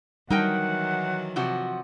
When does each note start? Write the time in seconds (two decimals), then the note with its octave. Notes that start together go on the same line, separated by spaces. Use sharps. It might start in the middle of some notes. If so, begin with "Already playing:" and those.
0.30 D#3 E3 F#3 G3 D#4 A#4 F#5 G5
1.36 C3 F3 F#4